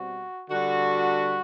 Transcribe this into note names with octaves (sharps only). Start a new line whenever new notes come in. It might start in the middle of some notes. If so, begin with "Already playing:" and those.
Already playing: B2 G3 C4 F#4
D3 G3 D4 F#4